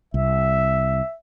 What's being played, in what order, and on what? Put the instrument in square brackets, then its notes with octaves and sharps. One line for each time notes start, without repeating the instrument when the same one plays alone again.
[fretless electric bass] C2 [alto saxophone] E5